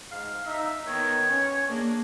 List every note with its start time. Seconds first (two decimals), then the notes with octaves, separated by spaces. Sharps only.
0.12 G#2 F5
0.46 D#4 E5
0.87 D#3 B3 C#5
1.29 C#4
1.68 A#3 D4 G#4